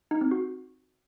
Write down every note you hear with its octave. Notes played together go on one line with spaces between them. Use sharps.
D#4
C4
F#4